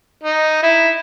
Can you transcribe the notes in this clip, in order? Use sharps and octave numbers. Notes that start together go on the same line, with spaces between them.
D#4
E4